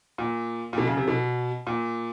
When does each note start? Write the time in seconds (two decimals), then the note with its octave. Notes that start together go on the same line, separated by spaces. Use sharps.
0.18 A#2
0.73 A#2
0.78 B2
0.87 C#3
0.97 C3
1.08 B2
1.67 A#2